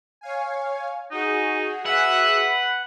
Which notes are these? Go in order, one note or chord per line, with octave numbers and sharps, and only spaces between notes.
C#5 F5 G#5
D#4 F#4 G#4
B4 E5 F#5